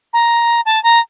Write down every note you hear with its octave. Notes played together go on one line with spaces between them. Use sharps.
A#5
A5
A#5